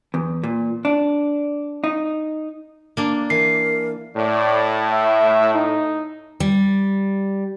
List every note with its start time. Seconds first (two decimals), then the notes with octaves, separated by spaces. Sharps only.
0.14 E2
0.44 A#2
0.85 D4
1.84 D#4
2.97 A#3 D4
3.30 E3 A#4 C7
4.17 A2 D5
4.92 E5
5.54 D#4
6.40 G3